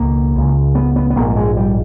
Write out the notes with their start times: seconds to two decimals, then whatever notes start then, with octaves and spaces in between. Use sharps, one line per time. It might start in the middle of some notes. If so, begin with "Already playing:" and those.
Already playing: C#2 B2 A#3
0.35 C#2 C#3
0.75 B3
0.96 B3
1.10 B3
1.16 A#1 G#2 A#3
1.30 A#3
1.36 G#3
1.57 G3